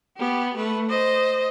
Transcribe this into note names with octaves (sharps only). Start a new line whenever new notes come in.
B3 G4
A3 B4
C5 D#5